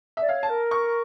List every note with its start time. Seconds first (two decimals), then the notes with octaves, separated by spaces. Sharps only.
0.17 D5 E5
0.29 C#5 F5
0.43 A5
0.50 A#4
0.71 C#6